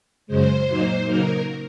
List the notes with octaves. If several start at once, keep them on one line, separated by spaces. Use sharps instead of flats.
F#2 C#3 G#3 C5
A#2 F#3 A#3 D#4
C#3 F#3 A#3 D#4 A#4